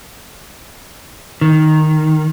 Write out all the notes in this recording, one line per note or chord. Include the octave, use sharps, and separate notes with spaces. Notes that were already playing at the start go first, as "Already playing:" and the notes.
D#3